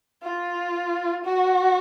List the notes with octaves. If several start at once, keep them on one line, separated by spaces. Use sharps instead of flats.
F4
F#4